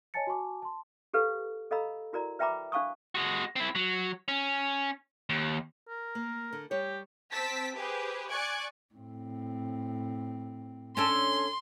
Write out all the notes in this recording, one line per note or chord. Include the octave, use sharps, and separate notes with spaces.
C#5 D#5 G#5 A5 A6 C#7
F#4 G#5 A5 C#6 D6
A5 C6
G4 A4 B4 F5
A4 D#5 F5 A#5 B5 E6
E4 F#4 A#4 D5 A#5
B4 E5 G5 A#5 B5 D6
D4 C5 F5 A5 C#6 D#6
G#3 F#4
C4 E4
F#3
C#4
D#2
A#4
A#3
D3
G3 G4 C#5
C4 G5 A5 E6 B6 D7
G4 G#4 B4 C5
D5 G#5 C#6 F#6 G#6 D7
A2 C4
C#4 D4 A4 C6